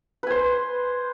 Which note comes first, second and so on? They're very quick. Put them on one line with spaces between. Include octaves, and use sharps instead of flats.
B4 G#5 C5